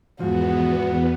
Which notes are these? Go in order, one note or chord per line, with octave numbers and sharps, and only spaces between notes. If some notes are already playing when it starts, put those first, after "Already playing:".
E2 G#2 F3 B3 F#4